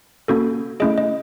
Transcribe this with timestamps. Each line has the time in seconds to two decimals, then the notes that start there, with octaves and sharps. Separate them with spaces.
0.28 A#3 C#4 F#4 A4
0.80 A3 C#4 E4 G#4 D#5
0.98 D#5